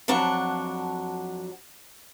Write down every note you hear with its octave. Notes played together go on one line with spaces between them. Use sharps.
F2 F#3 D4 F#5